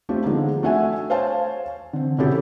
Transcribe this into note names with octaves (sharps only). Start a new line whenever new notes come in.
A3 C4 D4 F4 G4
D3 F3 G#3 B3 D#4
A3 D4 F#4 E5 F#5 G#5
C5 C#5 F5 G#5 A5
D3 C4
A#2 C#3 E4 F#4 G4 A4